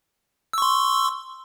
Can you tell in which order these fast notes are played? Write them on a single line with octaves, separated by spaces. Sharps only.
E6 C#6 C6